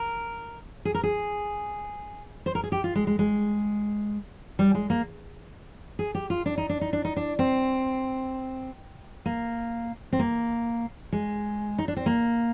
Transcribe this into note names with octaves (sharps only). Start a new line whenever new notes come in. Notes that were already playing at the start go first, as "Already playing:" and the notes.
Already playing: A#4
G#4
A#4
G#4
C5
A#4
G#4
G4
F4
G#3
G#3
G#3
G3
G#3
A#3
G#4
G4
F4
D4
D#4
D4
D#4
D4
D#4
D4
C4
A#3
C4
A#3
G#3
D#4
D4
C4
A#3